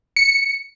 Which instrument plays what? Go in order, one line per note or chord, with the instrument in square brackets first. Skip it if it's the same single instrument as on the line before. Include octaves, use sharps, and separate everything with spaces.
[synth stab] C#7